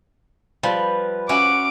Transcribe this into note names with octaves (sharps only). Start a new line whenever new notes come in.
F3 G3 B4
C#4 E4 F#4 D6